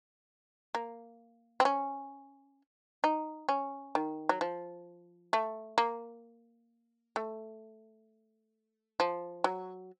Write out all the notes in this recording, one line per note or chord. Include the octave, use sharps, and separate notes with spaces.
A#3
C4
C#4
D#4
C#4
D#3
F#3
F3
A3
A#3
A3
F3
F#3